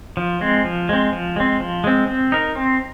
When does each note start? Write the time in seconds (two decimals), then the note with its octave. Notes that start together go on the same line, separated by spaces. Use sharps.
0.17 F3
0.41 G#3 C4
0.65 F3
0.89 G#3 C4
1.12 F3
1.36 G#3 C4
1.60 F3
1.84 G#3 C4
2.08 C4
2.32 D#4 A#4
2.56 C4